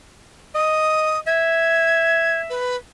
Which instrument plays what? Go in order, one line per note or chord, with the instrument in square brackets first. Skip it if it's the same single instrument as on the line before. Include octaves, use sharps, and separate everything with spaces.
[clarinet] D#5 [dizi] D#6
[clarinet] E5 [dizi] G#6
[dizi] B4